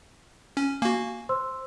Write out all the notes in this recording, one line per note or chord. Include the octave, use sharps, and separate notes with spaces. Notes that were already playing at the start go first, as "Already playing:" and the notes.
C#4
A#3 F#4 G#5
C5 C6 E6